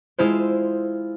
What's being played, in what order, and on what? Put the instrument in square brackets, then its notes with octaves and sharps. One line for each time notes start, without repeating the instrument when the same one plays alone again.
[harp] G#3 E4 F4 C5